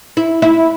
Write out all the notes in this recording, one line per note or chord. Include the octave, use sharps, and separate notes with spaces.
E4
E4